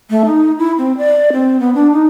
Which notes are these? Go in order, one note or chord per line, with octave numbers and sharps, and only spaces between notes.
A3
D#4
E4
C4
D5
C4
B3
D4
D#4